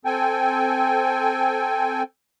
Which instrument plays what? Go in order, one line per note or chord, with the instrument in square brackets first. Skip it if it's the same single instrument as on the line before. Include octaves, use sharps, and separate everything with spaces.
[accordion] C4 A4 G5 G#5